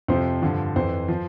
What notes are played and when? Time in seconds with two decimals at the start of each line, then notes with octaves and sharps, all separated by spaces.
0.08 F2 C3 F3 C5
0.42 G2 D3 F3
0.76 F2 E3 C5
1.08 F3